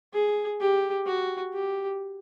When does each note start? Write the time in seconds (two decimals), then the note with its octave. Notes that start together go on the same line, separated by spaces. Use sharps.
0.13 G#4
0.61 G4
1.06 F#4
1.53 G4